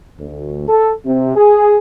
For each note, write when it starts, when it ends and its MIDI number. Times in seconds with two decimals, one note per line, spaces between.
0.20 0.68 38
0.68 0.91 69
1.05 1.36 48
1.36 1.77 68